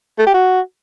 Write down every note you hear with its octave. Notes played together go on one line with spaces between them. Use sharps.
A3
G4
F#4